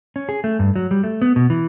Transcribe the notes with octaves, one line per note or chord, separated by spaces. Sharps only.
C#4
G#4
A3
G2
F#3
G3
A3
B3
B2
E3